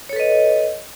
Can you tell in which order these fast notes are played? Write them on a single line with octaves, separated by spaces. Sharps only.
C#5 A4 B4 D#5